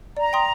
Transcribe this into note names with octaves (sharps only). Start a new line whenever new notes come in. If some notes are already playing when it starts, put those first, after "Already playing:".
D5 A#5
G5 C6 D#6